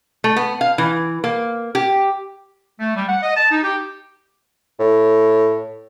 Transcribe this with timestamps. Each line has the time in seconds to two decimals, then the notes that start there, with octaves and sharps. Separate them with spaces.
0.24 A3
0.36 B3
0.61 F5
0.78 E3
1.24 A#3
1.75 G4
2.80 A3
2.96 G3
3.08 F#5
3.23 D#5
3.37 A5
3.51 D#4
3.63 G4
4.79 A2